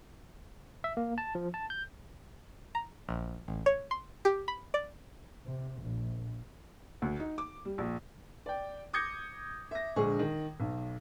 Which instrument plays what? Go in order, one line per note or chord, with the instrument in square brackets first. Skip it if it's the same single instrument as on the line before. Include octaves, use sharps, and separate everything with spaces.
[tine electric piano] E5
A#3
A5
F3
A5
G6
[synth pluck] A#5
A#1
A1
C#5
C6
G4
B5
D5
[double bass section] C3
A#1
[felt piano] D2
D#4
D6
G3
A#1
[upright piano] D5 G5
D6 D#6 G6 G#6 A#6 C#7
E5 A#6
A#1 D3 G#3 G#4 C#6
D#3
B1